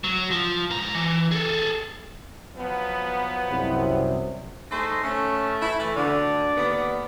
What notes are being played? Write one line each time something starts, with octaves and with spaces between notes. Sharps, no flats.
F#3
F3
G#2 A#5
E3
G#4 A4
F3 F#3 B3
C2 F#2 C3
A3 D#4 G#4 C5
A3 C#4
E4
E3 A3
D2 D3 D5
D#2 D3 B3